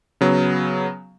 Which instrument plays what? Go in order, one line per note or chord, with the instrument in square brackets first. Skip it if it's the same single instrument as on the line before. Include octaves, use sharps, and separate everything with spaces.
[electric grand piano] C#3 F#3 B3